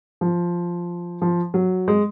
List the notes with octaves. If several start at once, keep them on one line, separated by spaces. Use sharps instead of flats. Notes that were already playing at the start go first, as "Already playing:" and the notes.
F3
F3
F#3
G#3